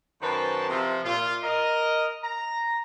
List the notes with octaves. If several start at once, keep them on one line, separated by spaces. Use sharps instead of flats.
F#2 D#3 B4 C5 A5
C3 F3
A#2 F4
A#4 D#5
A#5